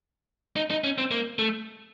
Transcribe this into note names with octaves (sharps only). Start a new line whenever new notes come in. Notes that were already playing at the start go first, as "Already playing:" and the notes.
D#4
D#4
C#4
C4
A#3
A3